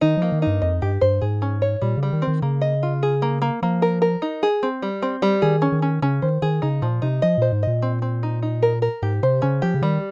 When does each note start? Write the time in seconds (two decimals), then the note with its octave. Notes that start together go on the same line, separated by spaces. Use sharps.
0.01 D#3 D#4
0.17 F3 A#3
0.32 D#3
0.42 G2 D#4
0.62 F2 D#5
0.82 G2 G4
1.01 G2 C5
1.21 G#2 G#4
1.42 C#4
1.62 C#5
1.82 A#2 G3
1.97 C#3
2.03 G3
2.12 D#3
2.22 C4
2.27 D#3
2.42 C#3 A#3
2.62 D#5
2.83 F4
3.03 G#4
3.22 A#3
3.42 A#3
3.62 F3 A#3
3.82 A#4
4.02 A#4
4.22 D#4
4.43 G#4
4.63 C4
4.82 G3
5.02 C4
5.22 G3
5.42 D#3 G#4
5.62 C#4
5.72 D#3
5.82 C#4
6.02 C#3 C#4
6.22 D#3 C5
6.42 D#3 G#4
6.62 C#3 D#4
6.82 A#2 F3
7.02 C3 D#4
7.22 F3 D#5
7.38 A#2 C5
7.52 G#2
7.63 A#2 D#5
7.82 C4
8.02 C4
8.23 D#4
8.42 D#4
8.63 A#4
8.82 A#4
9.02 G#2 G4
9.23 C3 C5
9.42 C#3 C#4
9.62 F3 G4
9.74 C#3
9.82 D#3 G3